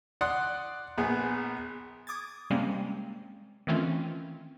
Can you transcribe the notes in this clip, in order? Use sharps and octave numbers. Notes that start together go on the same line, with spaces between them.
D5 F#5 C6 D#6
A#1 B3 G#4
D6 D#6 G#6 A6
C3 G3 G#3 A#3 C4 C#4
D#3 E3 A3 C4 C#4 F4